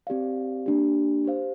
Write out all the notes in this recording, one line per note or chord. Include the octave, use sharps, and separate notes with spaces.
C4 G4 D5 F5
A#3 D4 G4
G4 C5 F5